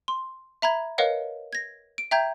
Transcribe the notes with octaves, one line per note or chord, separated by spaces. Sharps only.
C6
E5 A#5 B5 G#6
A#4 B4 C#5 D#5 F5 F#5
G#6 A#6
D7
E5 G5 A#5 G6 G#6